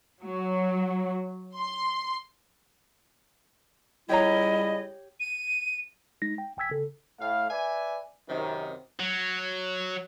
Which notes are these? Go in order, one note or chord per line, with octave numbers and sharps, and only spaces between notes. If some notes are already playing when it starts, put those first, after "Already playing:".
F#3
C6
C#2 G3 E4 G4 C#5 D#5 A#5
D#7
G#3 D#4 A#6
G5
G#1 G5 G#5 E6 G#6 B6
G1 C#3 A4
A2 F5
B4 D5 E5 G#5
F#2 C3 D#3
F#3